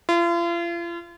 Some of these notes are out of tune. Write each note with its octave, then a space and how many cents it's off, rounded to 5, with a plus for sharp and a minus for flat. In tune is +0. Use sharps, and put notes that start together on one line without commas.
F4 -40